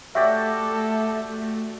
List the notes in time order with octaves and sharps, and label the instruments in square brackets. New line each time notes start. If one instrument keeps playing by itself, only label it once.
[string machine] A3 [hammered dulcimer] F#4 G4 D5 [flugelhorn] A4 [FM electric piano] E5